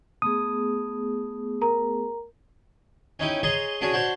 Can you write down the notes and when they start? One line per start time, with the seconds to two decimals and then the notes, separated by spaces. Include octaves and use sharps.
0.22 A3 B3 G#4 D#6
1.61 A#4 A#5
3.19 C#4 D#4 E4 G4
3.43 G#4 C#5 D#5 A#5 C6
3.81 C#4 D4 F#4 G#4 C#5
3.93 D4 F#4 C5 C#5